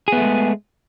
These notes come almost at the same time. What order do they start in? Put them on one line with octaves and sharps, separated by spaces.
G#4 B3 A3 G#3